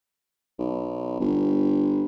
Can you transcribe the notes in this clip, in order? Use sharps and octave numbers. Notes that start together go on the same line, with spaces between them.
B1
G1